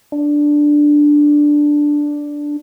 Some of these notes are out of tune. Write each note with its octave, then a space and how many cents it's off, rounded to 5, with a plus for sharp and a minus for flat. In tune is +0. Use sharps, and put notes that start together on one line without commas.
D4 +0